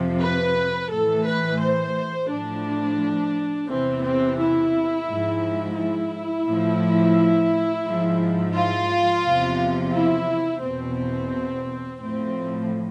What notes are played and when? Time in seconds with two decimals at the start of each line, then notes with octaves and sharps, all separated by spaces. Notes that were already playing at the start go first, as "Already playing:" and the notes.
Already playing: F2 C3 F3
0.21 B4
0.90 A2 E3 A4
1.26 B4
1.60 C5
2.30 A2 F3 D4
3.68 E2 C3 E3 C4
4.04 C4
4.38 E4
5.08 G#2 F3
5.77 E4
6.47 A2 F3
7.86 G#2 F3
8.55 F4
9.25 E2 C3 F3
9.94 E4
10.63 E2 B2 C4
12.02 A2 F3 C4